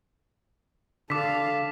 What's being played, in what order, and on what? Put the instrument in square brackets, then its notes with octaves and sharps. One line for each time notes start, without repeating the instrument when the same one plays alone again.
[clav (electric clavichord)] D3 [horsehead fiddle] A4 F5 [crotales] D6 B6